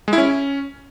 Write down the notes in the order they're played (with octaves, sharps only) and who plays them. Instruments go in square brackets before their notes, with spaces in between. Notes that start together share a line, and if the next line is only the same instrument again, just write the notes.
[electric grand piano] G#3
E4
C#4